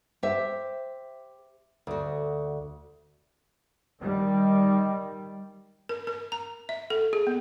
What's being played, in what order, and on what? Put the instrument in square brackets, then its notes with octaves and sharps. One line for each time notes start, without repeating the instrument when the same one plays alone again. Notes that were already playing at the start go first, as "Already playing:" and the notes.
[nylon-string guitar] G4 C5 E5
D2 F#4
[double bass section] D#3 G3
[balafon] A#4
A#4
A#5
E5
A4
G#4
B3